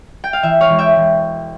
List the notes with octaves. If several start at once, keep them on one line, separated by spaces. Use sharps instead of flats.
G5
F5
E3 E5
C#5 F5
E1
E5 G5
E1